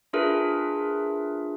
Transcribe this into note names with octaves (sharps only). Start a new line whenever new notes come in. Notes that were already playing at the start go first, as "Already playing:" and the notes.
D4 F4 G#4 A#4 B4 E5